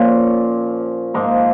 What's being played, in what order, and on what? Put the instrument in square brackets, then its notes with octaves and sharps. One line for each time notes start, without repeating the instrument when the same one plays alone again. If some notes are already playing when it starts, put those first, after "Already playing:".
Already playing: [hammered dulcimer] A#2 F3 C#4
G#2 F3 A#3 D#4